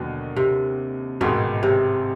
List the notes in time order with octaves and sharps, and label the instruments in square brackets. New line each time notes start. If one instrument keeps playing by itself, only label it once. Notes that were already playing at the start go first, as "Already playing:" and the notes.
Already playing: [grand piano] D#2 D3 F#3 [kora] B2
[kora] C3
[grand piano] A1 G#2 D#3 [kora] B2
[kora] C3